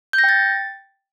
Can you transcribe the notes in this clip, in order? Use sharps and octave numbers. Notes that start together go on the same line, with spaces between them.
G6
A#6
G5
A6